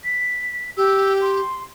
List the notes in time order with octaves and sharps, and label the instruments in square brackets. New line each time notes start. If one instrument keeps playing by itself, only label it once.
[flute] B6
[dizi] G4 [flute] E6
[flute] C6